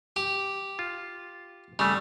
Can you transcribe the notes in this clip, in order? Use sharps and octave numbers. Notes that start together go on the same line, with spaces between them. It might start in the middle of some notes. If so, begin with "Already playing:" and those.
G4
F4
C#3 G3 A3